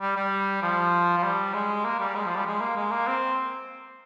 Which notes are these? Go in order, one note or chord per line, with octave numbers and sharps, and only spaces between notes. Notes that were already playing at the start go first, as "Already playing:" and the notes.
G3
G3
F3
F3
G3
G#3
A#3
G3
G#3
F3
G3
G#3
A#3
G#3
A#3
C4